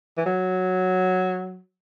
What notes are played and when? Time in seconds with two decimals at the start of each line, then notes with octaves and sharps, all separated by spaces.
0.18 E3
0.26 F#3